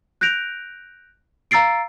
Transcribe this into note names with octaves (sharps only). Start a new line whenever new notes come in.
F#6 G6 A#6 D7 F7
F5 A#5 E6 A6 C7 D7